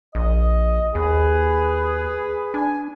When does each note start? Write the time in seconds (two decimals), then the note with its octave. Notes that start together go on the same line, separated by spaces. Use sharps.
0.15 A#1 D#5
0.95 D#2 G#4 B4
2.54 D4 G#5